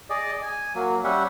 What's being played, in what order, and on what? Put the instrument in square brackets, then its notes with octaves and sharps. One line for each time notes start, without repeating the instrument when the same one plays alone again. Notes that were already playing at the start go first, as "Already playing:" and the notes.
[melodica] G#4 D5 D#5
G#5
F#3 A#3
G3 C#4 E5 F#5